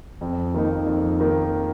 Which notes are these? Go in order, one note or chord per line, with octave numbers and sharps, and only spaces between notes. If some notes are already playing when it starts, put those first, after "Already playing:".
F2
D#3 A#3 D#4
F2
D#3 A#3 D#4